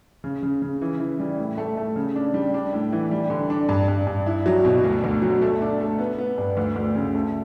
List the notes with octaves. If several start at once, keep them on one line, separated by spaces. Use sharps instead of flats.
C#3
C#3
C#3
E3
E3
G3
A2
A3
A3
C#3
D4
G3
D4
A2
E3
G3
D3
D4
G2
G2
G2
E4
F#3
B2
D2
D2
F#3
A3
D4
A3
B3
B3
G2
D2
D2
C#3
A3